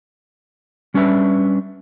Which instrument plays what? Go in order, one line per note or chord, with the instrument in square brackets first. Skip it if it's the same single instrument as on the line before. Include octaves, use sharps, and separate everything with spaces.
[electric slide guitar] G3 C#4 D4 B4 E5